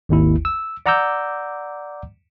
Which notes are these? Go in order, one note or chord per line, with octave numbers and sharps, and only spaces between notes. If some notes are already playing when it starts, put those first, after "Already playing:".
G#1 D#2 E4
E6
D5 F#5 A#5 D6 E6 G6